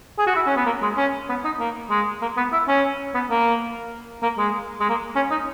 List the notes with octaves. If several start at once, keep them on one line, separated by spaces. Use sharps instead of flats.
G#4
F#4
E4
C#4
B3
A#3
G#3
C#4
B3
D#4
A#3
G#3
A#3
B3
E4
C#4
B3
A#3
A#3
G#3
G#3
A#3
C#4
D#4